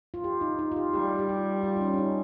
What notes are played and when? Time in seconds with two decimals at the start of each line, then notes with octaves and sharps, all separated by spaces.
0.14 F4
0.24 G4
0.41 D#4
0.59 D#4
0.72 F4
0.76 G4
0.93 G3 G4
1.19 G4
1.29 F4
1.63 F4
1.76 D#4
1.81 C#4
1.94 C#4
1.98 D#4